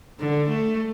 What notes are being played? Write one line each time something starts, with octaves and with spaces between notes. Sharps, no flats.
D3
A3